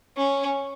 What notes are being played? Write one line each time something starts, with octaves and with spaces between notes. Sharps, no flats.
C#4